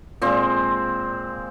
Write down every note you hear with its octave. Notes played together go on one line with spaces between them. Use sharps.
A#2 G#3 C4